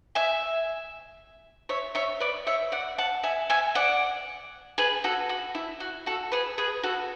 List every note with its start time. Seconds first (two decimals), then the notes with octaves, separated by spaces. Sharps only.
0.15 E5 G#5
1.69 C#5 E5
1.95 C#5 E5
2.20 B4 D5
2.47 C#5 E5
2.72 D5 F#5
2.98 F#5 A5
3.23 E5 G#5
3.50 E5 G#5
3.75 D5 F#5
4.78 G#4 B4
5.04 F#4 A4
5.29 F#4
5.55 E4
5.80 F#4
6.06 F#4 A4
6.32 G#4 B4
6.58 G#4 B4
6.83 F#4 A4